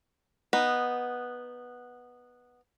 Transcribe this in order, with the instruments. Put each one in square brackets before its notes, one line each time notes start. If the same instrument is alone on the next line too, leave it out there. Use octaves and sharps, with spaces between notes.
[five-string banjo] B3 D#4